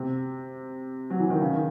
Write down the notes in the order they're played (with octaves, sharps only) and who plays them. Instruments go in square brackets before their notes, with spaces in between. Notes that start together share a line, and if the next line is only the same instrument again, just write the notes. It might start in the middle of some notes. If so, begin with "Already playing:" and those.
Already playing: [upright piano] C3
F#3
E3
D#3
C#3
D#3